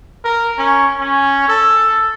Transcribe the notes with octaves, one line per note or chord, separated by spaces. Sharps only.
A#4
C#4
C#4
A4